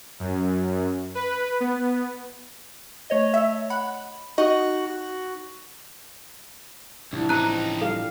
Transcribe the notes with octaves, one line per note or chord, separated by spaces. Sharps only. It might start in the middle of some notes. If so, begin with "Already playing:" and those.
F#2
B4
B3
A3 C#5 D#5
E5
F#5 B5
D#4 F#4 D#5
F#4
C2 A2 E3 F3 D4 E4
C#2 C4 D#4 A#5 F#6
G3 A4 F5